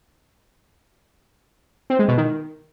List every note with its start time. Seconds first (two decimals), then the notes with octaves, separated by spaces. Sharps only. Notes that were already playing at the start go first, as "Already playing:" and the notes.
1.90 C4
1.99 G#3
2.08 B2
2.18 D#3